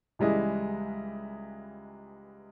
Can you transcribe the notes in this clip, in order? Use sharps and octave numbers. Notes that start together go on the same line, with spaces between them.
C#2 E3 G3 G#3 E4 D#5